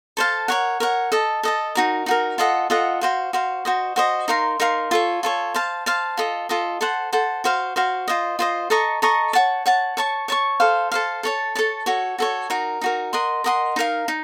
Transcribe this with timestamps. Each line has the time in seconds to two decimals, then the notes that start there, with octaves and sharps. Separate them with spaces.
0.17 A4 C5 F5 A5
0.48 A#4 C#5 F#5
0.80 A#4 C#5 F#5
1.12 A4 D#5 A5
1.43 A4 D#5 A5
1.75 D#4 F#4 A#4
2.06 D#4 F#4 A#4
2.38 F4 A4 D#5 F#5
2.70 F4 A4 D#5 F#5
3.01 F#4 C5 F5
3.33 F#4 C5 F5
3.65 F#4 C5 D#5
3.96 F#4 C5 D#5
4.28 D#4 A#4 F5 C6
4.60 D#4 A#4 F5 C6
4.91 F4 A4 C#5
5.23 F4 A4 C#5
5.54 C5 F5 A5
5.86 C5 F5 A5
6.17 F4 A4 D#5
6.49 F4 A4 D#5
6.81 A4 C5 F#5
7.12 A4 C5 F#5
7.44 F#4 C5 F5
7.76 F#4 C5 F5
8.08 F4 C5 D#5
8.39 F4 C5 D#5
8.70 A4 D#5 A#5 C#6
9.02 A4 D#5 A#5 C#6
9.33 C#5 F#5 A5
9.66 C#5 F#5 A5
9.97 C#5 A5 C#6
10.28 C#5 A5 C#6
10.60 A4 C5 F5
10.92 A4 C5 F5
11.23 A4 C#5 A5
11.55 A4 C#5 A5
11.86 F#4 A4 C#5
12.18 F#4 A4 C#5
12.50 D#4 F#4 A#4
12.81 D#4 F#4 A#4
13.13 A#4 D#5 F#5 C6
13.44 A#4 D#5 F#5 C6
13.76 D#4 A#4 F5
14.08 D#4